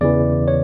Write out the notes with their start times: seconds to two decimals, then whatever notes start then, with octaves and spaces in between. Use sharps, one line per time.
0.01 E2 C#3 E3 D5
0.48 C#5